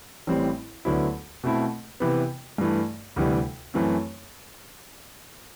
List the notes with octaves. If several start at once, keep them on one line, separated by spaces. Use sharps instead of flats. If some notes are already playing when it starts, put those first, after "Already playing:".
A1 A2 E3 G3 C4
D2 D3 F#3 B3 E4
B2 A3 C4 E4
C3 E3 B3
G2 E3 A3
D2 C3 E3 G3
F#2 E3 A3 C4